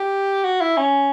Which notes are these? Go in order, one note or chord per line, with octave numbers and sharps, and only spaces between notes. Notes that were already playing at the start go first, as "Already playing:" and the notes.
Already playing: G4
F#4
E4
C#4